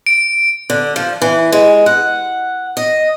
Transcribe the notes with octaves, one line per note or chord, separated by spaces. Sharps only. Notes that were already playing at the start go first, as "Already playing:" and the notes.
D7
D3
F3
E3
G#3
F#5
D#5